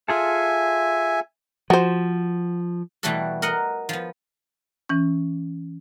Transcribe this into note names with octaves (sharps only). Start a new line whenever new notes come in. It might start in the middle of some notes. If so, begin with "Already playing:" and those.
F4 G#4 A4 E5 G#5
F3 F#4 C5
B2 E3 G3 A3 F#4 A4
A#4 D#5 F#5
F3 B3
E3 C#4